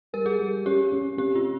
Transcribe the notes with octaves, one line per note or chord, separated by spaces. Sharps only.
G3 A#4
G#4
G3
C#4 G4
C#4
C3 G4
F4